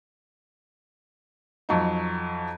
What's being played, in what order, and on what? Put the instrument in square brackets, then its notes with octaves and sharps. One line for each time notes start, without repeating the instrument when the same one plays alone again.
[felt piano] F2 F#3 D#4